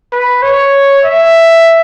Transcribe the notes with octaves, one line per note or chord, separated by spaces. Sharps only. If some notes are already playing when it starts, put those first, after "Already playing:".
B4
C#5
E5